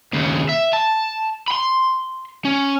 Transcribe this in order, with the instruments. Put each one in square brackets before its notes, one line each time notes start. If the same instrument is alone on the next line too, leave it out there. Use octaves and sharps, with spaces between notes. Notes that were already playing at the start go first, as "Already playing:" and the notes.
[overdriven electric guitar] D#2 C#3
E5
A5
B5 C6
C#4